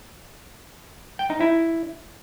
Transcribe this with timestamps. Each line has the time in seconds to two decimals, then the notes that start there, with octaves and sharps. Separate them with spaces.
1.19 G5
1.30 D#4
1.41 E4